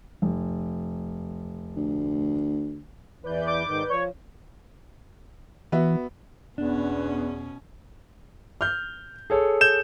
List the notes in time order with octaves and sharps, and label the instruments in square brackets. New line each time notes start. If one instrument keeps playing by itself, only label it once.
[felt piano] F1
[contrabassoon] D2
[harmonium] E2 E3 [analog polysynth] B4 D5 G6
[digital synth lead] D6
[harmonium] G#2 D#3
[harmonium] F3 [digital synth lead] C#5
[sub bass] E3 [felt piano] B3 F#4 E5
[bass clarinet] E2 [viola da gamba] B2 C#4 [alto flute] B3 [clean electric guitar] D4
[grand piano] F6 G6
G#4 A4 C#5
[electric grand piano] G6 E7